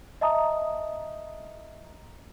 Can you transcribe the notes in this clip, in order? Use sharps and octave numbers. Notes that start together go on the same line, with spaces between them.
D#5 E5 A5 A#5 D#6